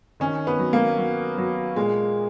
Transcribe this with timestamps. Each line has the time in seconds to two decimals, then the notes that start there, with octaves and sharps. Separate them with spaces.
0.20 D#3 C#4
0.47 B3
0.59 F#3
0.73 A#3
0.98 F#3
1.38 F#3
1.76 A#2 G#3